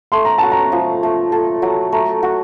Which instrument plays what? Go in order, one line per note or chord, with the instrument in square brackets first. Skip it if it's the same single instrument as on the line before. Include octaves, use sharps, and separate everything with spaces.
[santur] A3 [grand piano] C6
[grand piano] A#5
[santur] F#4 [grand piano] A5
[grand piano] A#5
[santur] F3
A3
A4
F#3
[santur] A3 [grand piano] A#5
[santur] F#4